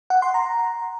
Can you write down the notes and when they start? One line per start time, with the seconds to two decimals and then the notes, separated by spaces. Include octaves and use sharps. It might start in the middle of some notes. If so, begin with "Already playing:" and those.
0.10 F#5
0.22 C6
0.34 A#5